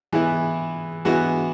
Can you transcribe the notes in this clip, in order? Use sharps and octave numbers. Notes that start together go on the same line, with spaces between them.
E3 G#3 B3 E4
E3 G#3 B3 E4 F#4